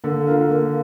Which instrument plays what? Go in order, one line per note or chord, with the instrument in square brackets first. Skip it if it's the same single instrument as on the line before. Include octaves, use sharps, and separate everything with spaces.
[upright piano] D3 [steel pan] A#3
[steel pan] F4 A#4 F5
A#3